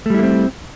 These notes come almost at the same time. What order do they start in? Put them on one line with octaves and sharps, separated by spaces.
A3 G3 E4 A#3 C4